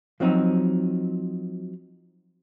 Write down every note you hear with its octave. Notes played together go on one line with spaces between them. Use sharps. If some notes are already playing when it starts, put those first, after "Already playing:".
F3 F#3 C4 D#4